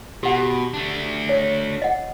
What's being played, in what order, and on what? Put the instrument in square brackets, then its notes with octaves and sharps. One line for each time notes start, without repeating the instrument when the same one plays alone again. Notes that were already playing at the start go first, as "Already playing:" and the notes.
[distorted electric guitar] B2 [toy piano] G4 F#5
[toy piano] G4
[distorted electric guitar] A3 D4
[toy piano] C#5
D#5 F#5